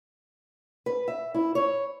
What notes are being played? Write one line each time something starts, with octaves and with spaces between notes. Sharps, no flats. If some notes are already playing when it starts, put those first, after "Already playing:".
B4
E5
E4
C#5